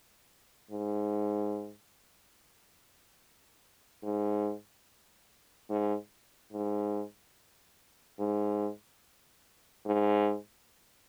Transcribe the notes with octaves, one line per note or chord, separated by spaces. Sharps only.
G#2
G#2
G#2
G#2
G#2
G#2